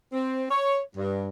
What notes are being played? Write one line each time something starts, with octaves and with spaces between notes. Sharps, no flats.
C4
C#5
G2